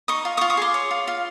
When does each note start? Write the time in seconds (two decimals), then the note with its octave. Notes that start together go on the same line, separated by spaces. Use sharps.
0.08 D#4 C#6 D#6
0.25 F4
0.37 C#6 D#6
0.41 F4
0.50 C#6 D#6
0.57 G#4 C6 D6
0.74 C#5
0.91 F4
1.07 F4